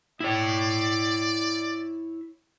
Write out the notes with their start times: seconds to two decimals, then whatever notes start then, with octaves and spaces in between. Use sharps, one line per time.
0.20 E4 C#5 D5